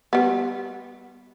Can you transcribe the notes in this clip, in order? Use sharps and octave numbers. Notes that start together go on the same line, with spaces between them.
G3 B3